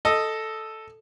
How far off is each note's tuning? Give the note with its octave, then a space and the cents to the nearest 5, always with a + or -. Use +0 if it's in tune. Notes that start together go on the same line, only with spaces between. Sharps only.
A4 +0 D#5 +0 D#6 +0